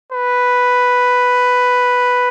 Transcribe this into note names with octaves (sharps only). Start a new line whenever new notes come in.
B4